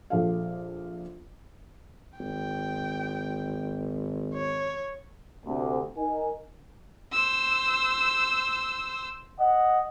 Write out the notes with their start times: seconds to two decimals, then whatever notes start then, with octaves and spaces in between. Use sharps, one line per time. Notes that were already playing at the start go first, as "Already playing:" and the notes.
0.10 A#1 A4 F5
2.19 G#1 G5
4.34 C#5
5.46 D2 C3
5.97 D#4 A#4 G#5
7.13 C5 E6
9.39 D#5 F#5